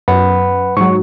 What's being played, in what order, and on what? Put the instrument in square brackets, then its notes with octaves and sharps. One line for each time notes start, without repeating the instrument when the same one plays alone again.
[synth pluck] F#2 [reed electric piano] B4 F#5 B5
[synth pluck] G#2 F#3 [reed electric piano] C#6